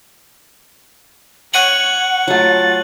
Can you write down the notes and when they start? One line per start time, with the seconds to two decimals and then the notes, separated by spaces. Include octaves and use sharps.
1.54 C#5 F#5 F#6 D#7 F#7
2.28 F#3 A3 F4 A6